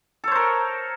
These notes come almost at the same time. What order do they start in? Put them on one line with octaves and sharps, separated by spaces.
A4 C#5 C5 A#4